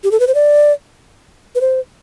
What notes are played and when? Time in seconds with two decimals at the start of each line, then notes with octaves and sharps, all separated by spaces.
0.04 G4
0.11 A4
0.20 B4
0.27 C5
0.35 D5
1.55 B4
1.61 C5